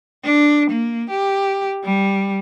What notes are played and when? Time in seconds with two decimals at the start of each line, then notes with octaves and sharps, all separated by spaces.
0.25 D4
0.70 A#3
1.10 G4
1.84 G3